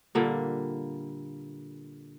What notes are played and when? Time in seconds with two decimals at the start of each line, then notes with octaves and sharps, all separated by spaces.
0.15 A#2 D3 G3 A#3